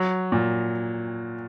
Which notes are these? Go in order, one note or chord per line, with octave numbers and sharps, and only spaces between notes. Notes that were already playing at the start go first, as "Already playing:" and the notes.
Already playing: F#3
A#2